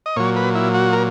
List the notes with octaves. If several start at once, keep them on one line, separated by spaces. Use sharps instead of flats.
D#5
A#2 F#3 C#5
B4
E4
F#4
A#4